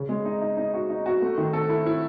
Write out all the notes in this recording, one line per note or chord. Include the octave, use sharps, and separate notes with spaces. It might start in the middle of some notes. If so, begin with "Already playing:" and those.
Already playing: C#3
G#3
D#4
D#4
D#4
F#4
D#4
F#4
A3
D#3
A4
E4
E4